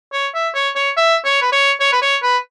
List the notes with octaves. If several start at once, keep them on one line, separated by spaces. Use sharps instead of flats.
C#5
E5
C#5
C#5
E5
C#5
B4
C#5
C#5
B4
C#5
B4